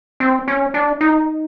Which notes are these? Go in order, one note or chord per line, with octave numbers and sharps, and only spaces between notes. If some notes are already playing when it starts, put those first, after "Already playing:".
C4
C#4
D4
D#4